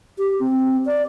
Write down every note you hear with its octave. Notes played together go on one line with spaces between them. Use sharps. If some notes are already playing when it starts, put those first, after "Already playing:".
G4
C4
D5